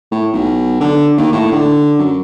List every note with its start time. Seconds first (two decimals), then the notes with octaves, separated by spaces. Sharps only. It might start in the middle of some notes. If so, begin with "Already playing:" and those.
0.11 A2
0.33 B1
0.81 D3
1.18 D#2
1.32 A2
1.52 D3
1.99 F#2